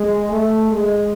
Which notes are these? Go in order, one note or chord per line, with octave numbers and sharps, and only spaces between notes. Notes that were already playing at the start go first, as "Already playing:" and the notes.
Already playing: G#3
A3
G#3